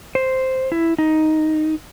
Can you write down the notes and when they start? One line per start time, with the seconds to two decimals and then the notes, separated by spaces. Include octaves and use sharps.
0.15 C5
0.72 E4
0.98 D#4